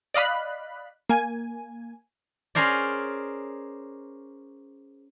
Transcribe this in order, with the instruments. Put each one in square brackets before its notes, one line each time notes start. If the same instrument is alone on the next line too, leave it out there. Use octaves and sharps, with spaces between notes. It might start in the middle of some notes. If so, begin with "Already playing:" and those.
[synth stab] D5 D#5 F5 B5 F#6
A#3 G#5
[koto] C#4 G#4 A#4 C5 D5